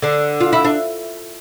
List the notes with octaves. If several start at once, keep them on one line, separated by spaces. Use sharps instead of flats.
D3 D4
F4
E4
D4